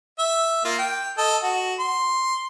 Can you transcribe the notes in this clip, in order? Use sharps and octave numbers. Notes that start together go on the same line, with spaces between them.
E5
A#3 F4
G5
A4 D#5
F#4
C6